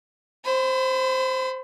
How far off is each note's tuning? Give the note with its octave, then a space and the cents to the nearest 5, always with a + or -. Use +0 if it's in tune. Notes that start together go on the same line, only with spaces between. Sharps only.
C5 +0 B5 +35